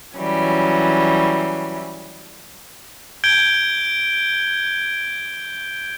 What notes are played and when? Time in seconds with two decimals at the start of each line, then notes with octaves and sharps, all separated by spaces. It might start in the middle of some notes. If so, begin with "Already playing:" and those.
0.18 E3 F#3 G3 C#4
3.24 G6 G#6 D7 G7